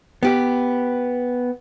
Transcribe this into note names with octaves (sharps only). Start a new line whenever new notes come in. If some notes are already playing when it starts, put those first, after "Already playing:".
B3 G4